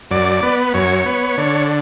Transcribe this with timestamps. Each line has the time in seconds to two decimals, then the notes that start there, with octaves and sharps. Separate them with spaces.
0.10 F#2 D5
0.43 B3
0.74 F#2 C#5
1.06 B3
1.38 D3